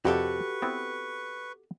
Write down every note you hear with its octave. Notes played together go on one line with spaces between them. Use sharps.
F2 C3 F#4 G4 A4 B4 C#6
B3 C4 E4